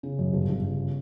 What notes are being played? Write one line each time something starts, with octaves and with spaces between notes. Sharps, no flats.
C#3
F#2
G1
G1
C#3